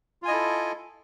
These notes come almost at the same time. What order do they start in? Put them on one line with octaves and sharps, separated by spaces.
F4 G#5 D#5 E4 A4